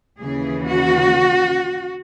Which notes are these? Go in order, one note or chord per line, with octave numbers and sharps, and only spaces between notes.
D#2 C#3 E3 G#4
F#4